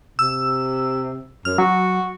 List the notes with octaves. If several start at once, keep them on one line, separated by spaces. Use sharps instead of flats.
C3 E6
F#2 F6
F#3 F#4